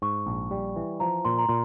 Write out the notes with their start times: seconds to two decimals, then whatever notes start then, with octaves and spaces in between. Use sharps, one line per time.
0.02 G#2 C#6
0.27 A#1
0.51 G3
0.76 E3
1.00 F3 A#5
1.25 A#2 C6
1.38 A#5
1.49 A#2 C6